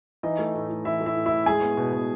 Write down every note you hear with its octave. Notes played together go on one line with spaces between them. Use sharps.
E3 D#4 D#5
A3
A2
A2
E3 E4 E5
A3
E4 E5
A2
E4 E5
A2
G#3 G#4 G#5
B3
B2
B2